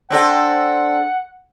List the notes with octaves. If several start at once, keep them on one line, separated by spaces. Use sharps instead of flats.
C4 D4 A4 F#5